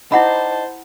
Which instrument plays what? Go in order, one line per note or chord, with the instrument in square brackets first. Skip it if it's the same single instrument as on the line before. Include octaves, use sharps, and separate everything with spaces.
[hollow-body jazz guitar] D#4 D5 [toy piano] E4 F#5 B5 [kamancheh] C5 A5